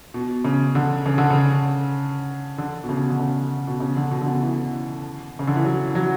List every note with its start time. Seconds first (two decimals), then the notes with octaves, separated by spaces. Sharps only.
0.14 B2
0.45 C#3
0.75 D3
1.06 C#3
1.18 D3
1.30 C#3
2.58 D3
2.84 B2
2.89 C#3
3.10 D3
3.19 C#3
3.67 B2
3.80 C#3
3.96 D3
4.11 B2
4.21 D3
4.26 C#3
4.42 E3
5.39 C#3
5.47 D3
5.56 E3
5.64 F#3
5.95 F#3